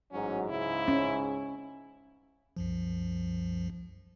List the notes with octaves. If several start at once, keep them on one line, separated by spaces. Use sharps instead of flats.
A1 G#2 F#3 C#4
C#2 G#2 C#3 E4
C#4
C2 F#2 F3